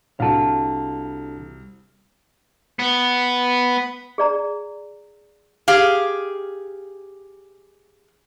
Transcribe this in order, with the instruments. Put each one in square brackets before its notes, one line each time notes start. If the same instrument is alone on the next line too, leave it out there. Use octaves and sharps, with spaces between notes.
[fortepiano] C2 [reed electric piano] D4 F#4 A4 [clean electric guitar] F5 A5
[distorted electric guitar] B3
[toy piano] G#4 D5 A#5
[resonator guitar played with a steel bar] G4 G#4 F5